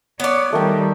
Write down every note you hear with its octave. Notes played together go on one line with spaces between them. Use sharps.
B3 C#5 D5
D#3 G3 A3 A#4 G5